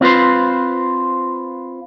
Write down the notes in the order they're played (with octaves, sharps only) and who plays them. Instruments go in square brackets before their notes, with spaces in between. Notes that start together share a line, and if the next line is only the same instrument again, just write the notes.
[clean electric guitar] C4 F4 B4 C5